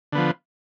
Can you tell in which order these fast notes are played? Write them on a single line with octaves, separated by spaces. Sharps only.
D3 B3 F3